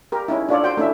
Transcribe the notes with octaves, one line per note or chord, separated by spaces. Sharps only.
G4 A#4
C#4 D#4 E4
D4 F4 A4 C#5 D5
F#4 C5 G5
A3 C#4 D4 E4 E5